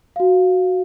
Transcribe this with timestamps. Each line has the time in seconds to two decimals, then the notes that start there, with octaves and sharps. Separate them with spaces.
0.16 F#4 F5